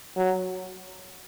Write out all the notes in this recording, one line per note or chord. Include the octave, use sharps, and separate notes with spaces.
F#3